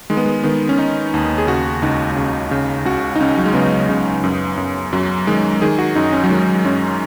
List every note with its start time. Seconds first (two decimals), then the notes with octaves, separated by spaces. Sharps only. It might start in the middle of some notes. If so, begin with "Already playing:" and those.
0.10 D#3 G#3
0.17 B3
0.26 G#3
0.43 D#3 B3
0.69 C#4
0.78 D#3 D#4
1.14 D#2
1.38 G#4
1.47 C#3 F#4
1.82 C#2 D#4
2.16 C#3
2.51 C#3
2.85 C#2 F#4
3.16 D#4
3.20 C#2 C#4
3.37 F#3
3.45 G#3
3.54 C#3 B3
3.89 C#3
4.24 F#2
4.57 F#2
4.93 F#2 F#3
5.27 D#3 G#3
5.62 D#3 G#4
5.79 F#4
5.96 F#2 D#4
6.13 C#4
6.24 F#3
6.30 D#3 G#3
6.65 F#2 C#4